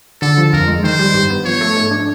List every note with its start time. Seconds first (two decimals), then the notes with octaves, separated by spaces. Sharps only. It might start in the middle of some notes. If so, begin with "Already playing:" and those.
0.21 D3 A4
0.38 F3
0.53 F2 A#4
0.68 G#3
0.84 D#3 C5
0.99 G3
1.14 G2
1.30 B3
1.45 F3 C#5
1.61 A3
1.76 G#2
1.91 D4